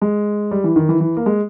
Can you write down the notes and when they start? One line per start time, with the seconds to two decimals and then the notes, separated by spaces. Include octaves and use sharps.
0.02 G#3
0.51 G3
0.64 E3
0.76 D#3
0.89 E3
1.00 E3
1.17 A#3
1.26 G#3